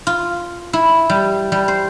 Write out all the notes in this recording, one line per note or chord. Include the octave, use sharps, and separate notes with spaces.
F4
E4
G3
G3
C5